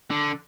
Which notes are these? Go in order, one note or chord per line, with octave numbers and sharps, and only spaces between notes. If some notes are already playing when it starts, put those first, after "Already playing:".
D3